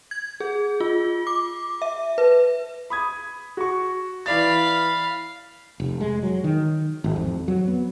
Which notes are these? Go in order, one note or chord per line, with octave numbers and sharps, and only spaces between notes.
G#6
G#4
F4
D6
E5
B4
B5 D#6 G#6
F#4 C#6
E3 D5 F5 B5 A6
F1
G#3
F#3
D#3
G#1
F2
F#3
B3